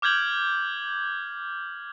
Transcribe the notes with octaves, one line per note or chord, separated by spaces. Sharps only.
D6 F6 G6 G#6 F#7